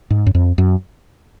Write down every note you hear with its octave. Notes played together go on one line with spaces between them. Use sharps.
G#2
F#2
F2
F#2